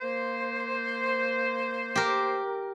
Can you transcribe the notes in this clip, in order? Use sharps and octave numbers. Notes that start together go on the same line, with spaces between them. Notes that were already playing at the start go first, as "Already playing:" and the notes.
A#3 C5
G4 A#4